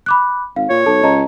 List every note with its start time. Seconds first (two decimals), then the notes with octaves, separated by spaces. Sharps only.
0.06 B5 D6 F#6
0.56 G#1 F5
0.70 A#2 C#5
0.86 B1 A4 A5
1.03 C#2 D#5 A5 A#5